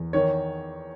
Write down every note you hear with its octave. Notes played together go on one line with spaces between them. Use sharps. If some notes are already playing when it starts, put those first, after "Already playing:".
Already playing: E2
D#3 C#5